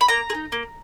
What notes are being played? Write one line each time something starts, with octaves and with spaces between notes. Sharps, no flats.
B5
A#3 A#5
G#4
D#4
A#3